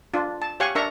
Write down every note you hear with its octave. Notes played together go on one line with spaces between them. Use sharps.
D4 F4
A5
G4 C#5 F5 F#5 G#5 C#6
D4 A#4 E5 A#5 C#6